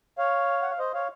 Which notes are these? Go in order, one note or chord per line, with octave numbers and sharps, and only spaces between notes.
C#5 F5
F#5
F5
C5 D#5
C#5 F5